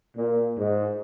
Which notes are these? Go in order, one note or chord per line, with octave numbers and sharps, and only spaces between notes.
A#2
G#2